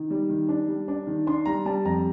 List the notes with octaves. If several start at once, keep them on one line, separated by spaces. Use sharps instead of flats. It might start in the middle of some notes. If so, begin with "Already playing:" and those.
Already playing: D#3
G3
D#3
D4
G3
D4
D#3
D4 C6
G3 A#5
G3 A5
F2 A#5